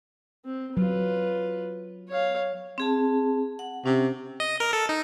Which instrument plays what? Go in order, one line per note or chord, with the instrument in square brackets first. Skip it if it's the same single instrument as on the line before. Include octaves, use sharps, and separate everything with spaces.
[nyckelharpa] C4
[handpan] F#3 [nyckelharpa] F4 B4
[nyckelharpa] C#5 F5
[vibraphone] C4 G#4 A5
F#5
[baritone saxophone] C3 [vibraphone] C#4
[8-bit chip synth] D#5
A#4
A4
D#4